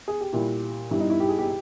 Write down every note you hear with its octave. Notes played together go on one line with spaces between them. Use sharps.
G#4
G4
A#2 G3 E4
G2 G3 E4
D#4
E4
G4
G#4
G4